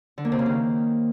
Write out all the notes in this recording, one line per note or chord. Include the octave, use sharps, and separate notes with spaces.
D3
A#3
C3
C#3
D#3